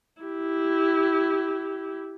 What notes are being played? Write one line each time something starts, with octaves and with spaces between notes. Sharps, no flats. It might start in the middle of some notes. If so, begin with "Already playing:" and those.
E4 G4